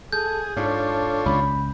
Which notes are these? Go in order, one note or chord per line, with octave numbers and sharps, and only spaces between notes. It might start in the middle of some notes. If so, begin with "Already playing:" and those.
G#4 A4 G6
G#2 D4 F4 A4 C#5
C#2 B5